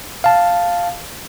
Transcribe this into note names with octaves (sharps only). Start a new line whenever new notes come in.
F5 A5